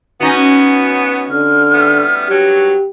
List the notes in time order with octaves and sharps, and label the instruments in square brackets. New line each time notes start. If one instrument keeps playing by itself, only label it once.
[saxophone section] F#2 B3 [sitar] C#4 D#4 F#4
[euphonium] D3 [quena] F6
[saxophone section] G3 A3 B3
[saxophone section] G2 F#3 [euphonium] G4